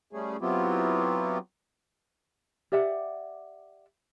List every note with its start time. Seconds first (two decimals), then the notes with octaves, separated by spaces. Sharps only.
0.13 G3 A3 C#4 G#4
0.41 F#3 B3 C4 E4 F4 G4
2.72 G4 D5 E5 F#5